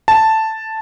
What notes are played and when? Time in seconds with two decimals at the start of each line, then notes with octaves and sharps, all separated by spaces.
0.08 A5